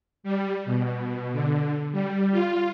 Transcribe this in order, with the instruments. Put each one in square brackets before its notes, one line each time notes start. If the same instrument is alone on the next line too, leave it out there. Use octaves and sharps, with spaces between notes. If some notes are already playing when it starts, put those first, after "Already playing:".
[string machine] G3
B2
D3
G3
F4